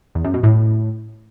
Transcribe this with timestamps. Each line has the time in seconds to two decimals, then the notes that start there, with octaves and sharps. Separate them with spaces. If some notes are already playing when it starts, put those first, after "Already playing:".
0.15 E2
0.25 F#2
0.34 B2
0.43 A2